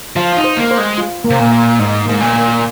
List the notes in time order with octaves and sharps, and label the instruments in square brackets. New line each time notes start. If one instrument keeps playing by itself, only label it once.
[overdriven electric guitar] F3 [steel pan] F5
[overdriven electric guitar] F4
D#4
[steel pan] C5
[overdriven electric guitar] A#3
[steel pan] C5
[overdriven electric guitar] G#3
[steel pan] F4
A#3
[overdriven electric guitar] C3
A#2
[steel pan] F5
[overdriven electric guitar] G#2 [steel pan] D#5
[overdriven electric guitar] G#2 [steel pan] A#3
[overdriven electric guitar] A#2
[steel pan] A#3